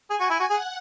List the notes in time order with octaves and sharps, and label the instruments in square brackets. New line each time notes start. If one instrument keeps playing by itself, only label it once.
[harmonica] G#4 [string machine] G#5
[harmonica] F#4
E4
F#4
[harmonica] G#4 [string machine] F#5